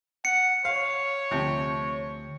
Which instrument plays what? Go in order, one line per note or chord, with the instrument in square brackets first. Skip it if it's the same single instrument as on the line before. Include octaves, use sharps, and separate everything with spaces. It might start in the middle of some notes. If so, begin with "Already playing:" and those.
[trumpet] F#5 [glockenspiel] C#7
[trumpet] C#5 [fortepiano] F5
[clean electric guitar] D2 [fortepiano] C3 F3